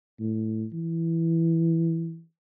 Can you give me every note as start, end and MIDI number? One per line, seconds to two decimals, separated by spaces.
0.20 0.65 45
0.73 2.22 52